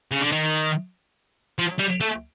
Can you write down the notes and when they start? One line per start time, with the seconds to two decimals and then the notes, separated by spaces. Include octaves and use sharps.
0.11 C#3
0.21 D3
0.32 D#3
1.59 F3
1.79 G3
2.01 A3